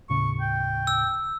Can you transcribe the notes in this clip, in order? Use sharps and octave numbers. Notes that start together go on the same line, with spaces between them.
D#2 A2 C#3 C#6
G5
E6